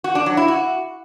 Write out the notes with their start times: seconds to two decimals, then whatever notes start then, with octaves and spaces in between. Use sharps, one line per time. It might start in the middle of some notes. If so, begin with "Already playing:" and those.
0.04 F#4
0.15 D4
0.26 F#3
0.37 E4
0.48 F#4